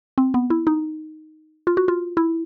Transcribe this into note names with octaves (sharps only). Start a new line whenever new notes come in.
C4
B3
E4
D#4
F4
F#4
F4
E4